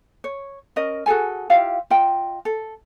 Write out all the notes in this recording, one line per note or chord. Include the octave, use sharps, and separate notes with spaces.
C#5
C#4 A#4 D#5
F#4 G#4 A4 G#5
E4 F4 G4 F5
F4 D#5 G5
A4